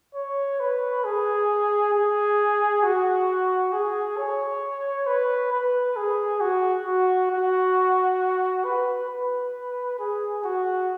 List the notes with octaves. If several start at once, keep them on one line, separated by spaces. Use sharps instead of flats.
C#5
B4
G#4
G#4
F#4
G#4
C#5
B4
B4
G#4
F#4
F#4
F#4
B4
B4
G#4
F#4